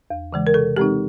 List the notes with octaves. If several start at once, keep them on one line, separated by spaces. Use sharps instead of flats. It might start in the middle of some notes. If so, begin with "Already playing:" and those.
E2
C#3 E3 G#3
A#4
C3 A4
E3 G#3 C4 D#4 G4